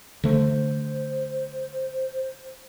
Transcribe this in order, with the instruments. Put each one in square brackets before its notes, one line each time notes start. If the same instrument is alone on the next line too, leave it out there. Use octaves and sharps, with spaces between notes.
[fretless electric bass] D3 A3 [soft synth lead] C5